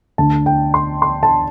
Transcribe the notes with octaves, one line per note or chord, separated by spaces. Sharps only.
D2 D3 A5
G5
C6
C6
A5